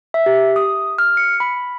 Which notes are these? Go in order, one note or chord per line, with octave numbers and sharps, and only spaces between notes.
E5
G4
D#6
F6
C#7
B5